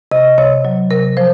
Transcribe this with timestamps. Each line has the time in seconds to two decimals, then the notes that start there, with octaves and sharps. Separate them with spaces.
0.11 C3 D#5
0.38 C3 C#5
0.65 F#3
0.90 C3 A#4
1.17 F3 C5